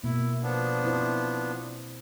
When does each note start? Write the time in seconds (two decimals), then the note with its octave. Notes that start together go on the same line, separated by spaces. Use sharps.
0.04 B2 A#3 E4
0.43 F3 B3 D4
0.83 C4 E4 C5